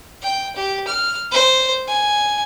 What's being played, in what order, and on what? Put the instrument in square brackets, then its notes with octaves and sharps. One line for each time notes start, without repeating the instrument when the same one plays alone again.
[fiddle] G5
G4
F6
C5
G#5